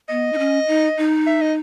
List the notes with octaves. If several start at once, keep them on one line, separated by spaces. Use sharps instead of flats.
B3 D#5
D#4
C#4
D#4
D#4
E5
D#5